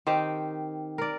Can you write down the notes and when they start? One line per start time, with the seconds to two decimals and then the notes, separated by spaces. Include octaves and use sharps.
0.07 D#3 C4 G4
0.98 A#4 D5